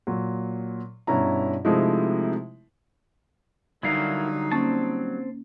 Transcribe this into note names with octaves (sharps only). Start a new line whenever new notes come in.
A#2 F#3
G2 B2 C#4 E4 A#5
C3 F3 G#3 A3 D#4 E4
D3 F#3 G3 D#4 E4 F#4 A#4 F5
A#3 C4 C#4 A5